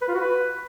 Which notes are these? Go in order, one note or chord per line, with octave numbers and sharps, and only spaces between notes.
B4
F4
F#4
B4